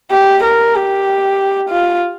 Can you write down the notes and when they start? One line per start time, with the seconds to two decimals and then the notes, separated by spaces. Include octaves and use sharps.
0.11 G4
0.44 A#4
0.75 G4
1.70 F4